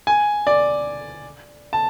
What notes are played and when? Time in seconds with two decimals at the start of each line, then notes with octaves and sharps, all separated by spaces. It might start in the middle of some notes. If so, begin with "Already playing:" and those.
0.07 G#5
0.47 D5
1.73 A5